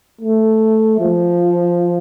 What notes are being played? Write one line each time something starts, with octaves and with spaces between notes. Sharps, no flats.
A3
F3